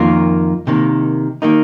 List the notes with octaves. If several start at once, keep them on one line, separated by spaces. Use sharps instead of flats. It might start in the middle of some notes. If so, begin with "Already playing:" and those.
Already playing: F2 D#3 A#3 F4
C3 D#3 A#3
D#3 A#3 D#4